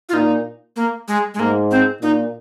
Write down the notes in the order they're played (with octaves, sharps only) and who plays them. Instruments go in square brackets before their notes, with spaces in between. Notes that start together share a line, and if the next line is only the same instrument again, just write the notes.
[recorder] F4
[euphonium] A#2 [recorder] D#4
[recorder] A#3
G#3
G#3
[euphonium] G#2 [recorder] A#3
[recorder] C4
[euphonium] A#2 [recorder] D#4